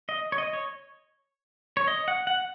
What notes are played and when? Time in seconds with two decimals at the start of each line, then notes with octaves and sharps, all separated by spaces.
0.09 D#5
0.32 C#5
0.38 D#5
0.53 C#5
1.77 C#5
1.88 D#5
2.08 F#5
2.27 F#5